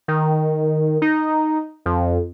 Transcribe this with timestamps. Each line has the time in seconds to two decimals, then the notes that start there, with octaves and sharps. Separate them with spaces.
0.08 D#3
1.02 D#4
1.86 F2